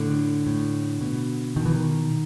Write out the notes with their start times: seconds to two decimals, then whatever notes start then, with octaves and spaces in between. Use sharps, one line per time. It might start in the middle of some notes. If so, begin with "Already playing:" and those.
Already playing: A2 D3
0.47 A2
1.01 B2
1.56 B2 D#3
1.66 E3
1.74 D#3